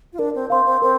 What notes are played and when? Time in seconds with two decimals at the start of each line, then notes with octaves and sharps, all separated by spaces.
0.13 F4
0.19 D4 A#4
0.35 C4
0.50 C4 F5 C6
0.66 C4
0.82 C4 A#4